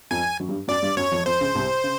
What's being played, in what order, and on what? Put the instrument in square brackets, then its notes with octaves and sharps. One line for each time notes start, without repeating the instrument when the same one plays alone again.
[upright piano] F2 F3 [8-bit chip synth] G#5
[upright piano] F#2 F#3
G2 G3
[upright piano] F#2 F#3 [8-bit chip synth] D5
[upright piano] G2 G3
[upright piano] F#2 F#3 [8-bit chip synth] C#5
[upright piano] F2 F3
[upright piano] F2 F3 [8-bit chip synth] C5
[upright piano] C#2 C#3
C2 C3
C#3